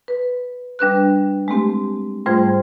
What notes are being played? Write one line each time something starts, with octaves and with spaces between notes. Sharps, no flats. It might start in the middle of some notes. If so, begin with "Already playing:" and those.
B4
G3 D4 B4 F#6
G#3 A3 C4 G4
G#2 G3 A3 F4 C5 G#6